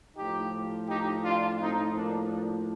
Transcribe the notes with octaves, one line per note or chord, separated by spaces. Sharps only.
A2 F3 D#4 G4
D#4 G4
D4 F4
A2 F3 C4 D#4
A#3 D4
A#3 D4